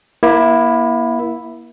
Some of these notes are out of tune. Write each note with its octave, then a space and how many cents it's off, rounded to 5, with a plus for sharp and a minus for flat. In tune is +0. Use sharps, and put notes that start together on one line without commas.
A#3 +35 E4 +0